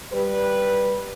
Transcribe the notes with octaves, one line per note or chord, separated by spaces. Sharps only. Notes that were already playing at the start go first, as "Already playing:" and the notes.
G3 B4